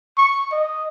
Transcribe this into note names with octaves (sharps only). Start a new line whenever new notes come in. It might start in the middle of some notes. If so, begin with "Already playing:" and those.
C#6
D#5